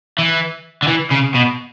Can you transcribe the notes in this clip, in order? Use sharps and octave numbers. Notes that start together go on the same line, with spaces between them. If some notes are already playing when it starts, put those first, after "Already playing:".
E3
D3
E3
C#3
B2